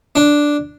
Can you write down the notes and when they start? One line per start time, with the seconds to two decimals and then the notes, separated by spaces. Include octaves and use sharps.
0.15 D4